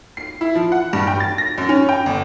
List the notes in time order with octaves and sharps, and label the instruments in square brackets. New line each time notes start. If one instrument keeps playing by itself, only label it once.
[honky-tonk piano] C7
E4
F3
F#5
G2
G5
A6
A#6
F#2
C#4
G5
G1